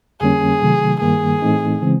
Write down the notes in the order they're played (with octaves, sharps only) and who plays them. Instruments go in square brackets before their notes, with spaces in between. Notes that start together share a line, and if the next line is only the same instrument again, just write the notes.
[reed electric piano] F2 D3 G3 A#3 C#4 [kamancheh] G#4
[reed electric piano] C3 D#3 F#3 A3
[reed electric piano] G2 D#3 G3 A#3 [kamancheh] G#4
[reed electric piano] A2 E3 A3 C4 D#4
C#3 E3 G#3 C4